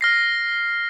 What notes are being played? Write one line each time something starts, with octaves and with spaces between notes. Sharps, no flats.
F6 A#6 C7